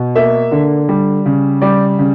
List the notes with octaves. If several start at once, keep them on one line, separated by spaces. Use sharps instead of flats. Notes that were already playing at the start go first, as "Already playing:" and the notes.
Already playing: B2
A#3 E5
D3
G3
C#3
G3 D5
C#3